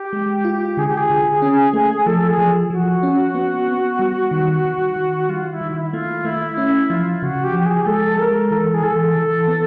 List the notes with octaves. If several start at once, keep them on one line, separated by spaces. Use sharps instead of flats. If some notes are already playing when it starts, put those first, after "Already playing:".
Already playing: G4
G#3
F4
D3 G#4
G4
G#4
D3
C#4
A3
F3 A4
G#4
F3
F3 F#4
C#4
B3
B3
G3
D#3
D#3
D#3
G3 F4
E4
D#3
E4
A3 F4
A3 E4
C#4 E4
F3 F4
C#3 F#4
G4
F3
G4
G#4
G#3 A4
G#3 A#4
E3 A4
G#4
E3 A4
E3
B3